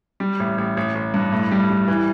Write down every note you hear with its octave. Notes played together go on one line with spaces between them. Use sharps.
G3
A1
A1
A1
A1
G2
A2
G3
G3
E3